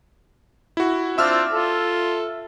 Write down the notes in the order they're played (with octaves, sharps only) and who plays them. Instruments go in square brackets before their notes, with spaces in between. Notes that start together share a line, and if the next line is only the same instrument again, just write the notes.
[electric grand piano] E4 F#4
[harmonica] C4 D4 F4 [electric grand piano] E5 E6 F6
[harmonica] F4 A4